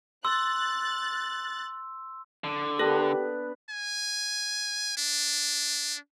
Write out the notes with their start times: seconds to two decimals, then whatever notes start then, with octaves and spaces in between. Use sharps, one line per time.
0.25 C6 E6 F#6 A6
2.44 D3
2.79 B3 D4 G4 A4 B4
3.70 G#5
4.97 D4